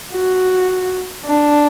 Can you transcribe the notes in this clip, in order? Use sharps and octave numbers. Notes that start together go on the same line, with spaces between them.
F#4
D4